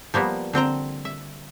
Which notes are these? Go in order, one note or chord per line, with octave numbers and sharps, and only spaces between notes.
F3 G3 A#3 B3
D3 C4 G5 A#5
E5